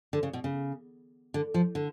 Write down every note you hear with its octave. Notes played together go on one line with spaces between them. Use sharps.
D3
C#3
B2
C#3
D3
F3
D3